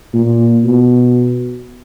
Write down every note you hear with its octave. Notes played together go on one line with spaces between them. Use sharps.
A#2
B2